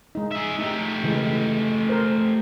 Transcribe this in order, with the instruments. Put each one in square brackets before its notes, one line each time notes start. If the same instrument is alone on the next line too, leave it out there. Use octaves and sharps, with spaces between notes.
[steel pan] G#3 D#4
[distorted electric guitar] G#4 E5
[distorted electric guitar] A3 G4 [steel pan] D#4
[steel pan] C#3 E3 G#3
A#4 C5